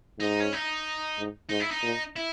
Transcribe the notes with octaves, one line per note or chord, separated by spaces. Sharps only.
G#2 D#4
C#4
D#4
G#2
G#2 D#4
E4
D#4
A#2
E4